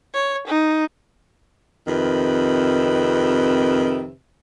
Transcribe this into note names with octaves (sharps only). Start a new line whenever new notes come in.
C#5
D#4
F2 C3 D#3 B4